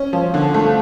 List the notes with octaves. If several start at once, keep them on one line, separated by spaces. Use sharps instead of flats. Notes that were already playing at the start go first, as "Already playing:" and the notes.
Already playing: C#4
F3
D3
A3